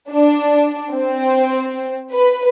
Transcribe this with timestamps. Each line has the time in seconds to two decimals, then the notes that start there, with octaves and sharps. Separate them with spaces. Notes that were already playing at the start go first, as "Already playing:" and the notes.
0.11 D4
0.91 C4
2.12 B4